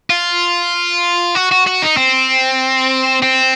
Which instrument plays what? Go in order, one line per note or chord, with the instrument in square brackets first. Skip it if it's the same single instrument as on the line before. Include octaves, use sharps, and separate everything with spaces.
[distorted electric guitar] F4
F#4
F#4
F#4
D#4
C4
C4